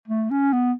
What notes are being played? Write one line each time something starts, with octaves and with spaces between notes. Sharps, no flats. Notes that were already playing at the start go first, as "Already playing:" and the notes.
A3
C#4
B3